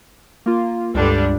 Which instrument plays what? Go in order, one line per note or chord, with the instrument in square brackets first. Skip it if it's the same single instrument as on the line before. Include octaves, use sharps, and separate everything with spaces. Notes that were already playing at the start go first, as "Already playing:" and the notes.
[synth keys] A#3 F4
[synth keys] C#2 G2 [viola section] D3 G3 D4